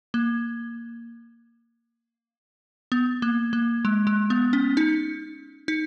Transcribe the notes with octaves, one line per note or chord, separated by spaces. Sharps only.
A#3
B3
A#3
A#3
G#3
G#3
B3
C#4
D#4
D#4